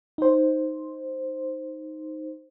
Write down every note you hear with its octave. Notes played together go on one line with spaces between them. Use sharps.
D#4 C5